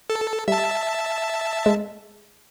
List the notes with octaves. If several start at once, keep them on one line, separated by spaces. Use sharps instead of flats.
A4
G3 E5 A5
G#3